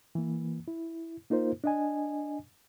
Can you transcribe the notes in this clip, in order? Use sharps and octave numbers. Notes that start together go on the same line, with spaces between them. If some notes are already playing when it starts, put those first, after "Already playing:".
E3 A#3
E4
A#3 D#4 F4 A#4 C5
D4 D#5 G#5